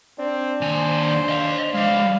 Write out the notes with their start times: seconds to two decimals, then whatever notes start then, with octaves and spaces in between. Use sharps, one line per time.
0.19 C4 D4
0.62 D#2 C5 G#5
1.29 D#5 F5
1.74 G#3 D5 F5